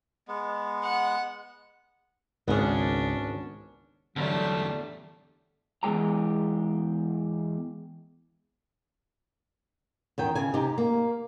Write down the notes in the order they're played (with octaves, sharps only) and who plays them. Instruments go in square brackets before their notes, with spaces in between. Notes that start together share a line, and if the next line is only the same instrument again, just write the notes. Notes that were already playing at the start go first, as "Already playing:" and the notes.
[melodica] G#3 B3
[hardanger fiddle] F#5
[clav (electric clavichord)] G#1 [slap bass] C#2 [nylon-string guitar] B3 G#4 [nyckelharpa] C#4 D4
[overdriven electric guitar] E2 G3 [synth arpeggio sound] D3 [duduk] F#3 [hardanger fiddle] A3 A5
[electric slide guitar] E2 G2 G#3 G4 A#5
[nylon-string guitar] E2 D#3 G5
C#3 G#5
C3 D#4 G4
A#3